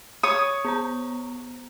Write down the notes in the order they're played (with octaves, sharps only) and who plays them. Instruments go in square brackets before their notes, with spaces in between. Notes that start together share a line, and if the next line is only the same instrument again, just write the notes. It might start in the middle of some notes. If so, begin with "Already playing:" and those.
[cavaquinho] C#5 D#6
[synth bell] B3 C5 A#5